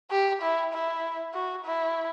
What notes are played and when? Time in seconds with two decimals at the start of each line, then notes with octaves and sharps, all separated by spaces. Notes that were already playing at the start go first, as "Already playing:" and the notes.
0.11 G4
0.42 E4
0.73 E4
1.34 F#4
1.64 E4